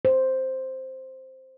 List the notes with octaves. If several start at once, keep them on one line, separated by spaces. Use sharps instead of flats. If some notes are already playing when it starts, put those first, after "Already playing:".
C5